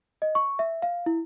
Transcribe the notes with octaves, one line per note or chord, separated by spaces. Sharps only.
D#5
C#6
E5
F5
E4